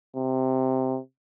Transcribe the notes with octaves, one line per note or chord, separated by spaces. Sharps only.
C3